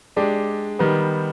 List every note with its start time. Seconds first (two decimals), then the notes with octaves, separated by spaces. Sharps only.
0.16 G#3 D4 G4 D5
0.79 D#3 G3 B3